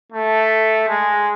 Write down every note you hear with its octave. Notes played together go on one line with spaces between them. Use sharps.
A3
G#3